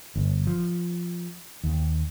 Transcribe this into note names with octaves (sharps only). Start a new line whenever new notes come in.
G1
F3
D#2